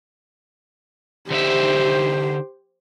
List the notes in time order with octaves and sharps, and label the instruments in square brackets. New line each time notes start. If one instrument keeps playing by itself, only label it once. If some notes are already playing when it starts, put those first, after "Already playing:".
[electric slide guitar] D3 D#4 E5 [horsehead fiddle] G4 C5